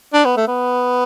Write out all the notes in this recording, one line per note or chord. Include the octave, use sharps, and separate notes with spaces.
D4
B3
A3
B3